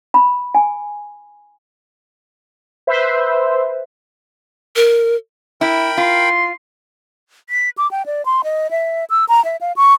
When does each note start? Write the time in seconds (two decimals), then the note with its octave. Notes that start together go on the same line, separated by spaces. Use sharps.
0.14 B5
0.55 G#5
2.87 B4 C5 E5
4.76 A#4
5.61 E4 A#4 G5 B5
5.97 F4 C6
7.49 B6
7.78 D6
7.91 G5
8.06 D5
8.25 C6
8.44 D#5
8.71 E5
9.10 E6
9.28 A#5
9.45 E5
9.61 F5
9.76 C#6